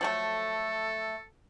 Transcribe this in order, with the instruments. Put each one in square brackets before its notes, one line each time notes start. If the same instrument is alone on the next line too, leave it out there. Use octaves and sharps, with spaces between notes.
[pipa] F3 F#3 A3 [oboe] A4